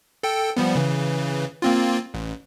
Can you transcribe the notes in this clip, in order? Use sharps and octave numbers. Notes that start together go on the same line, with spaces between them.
A4 G5
F3 G3 B3
C#3 E3
A#3 C4 F4
A1